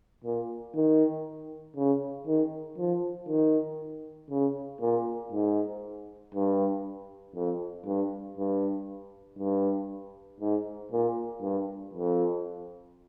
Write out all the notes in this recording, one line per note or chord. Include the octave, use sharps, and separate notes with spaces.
A#2
D#3
C#3
D#3
F3
D#3
C#3
A#2
G#2
G2
F2
G2
G2
G2
G#2
A#2
G2
F2